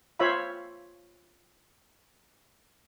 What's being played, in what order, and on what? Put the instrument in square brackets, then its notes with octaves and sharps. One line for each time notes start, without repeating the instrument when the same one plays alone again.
[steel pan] F4 C5 C#5 E5 F5 B5